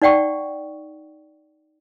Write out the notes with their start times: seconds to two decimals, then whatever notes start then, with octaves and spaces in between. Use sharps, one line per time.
0.02 D#4 D5 F#5 G5 C#6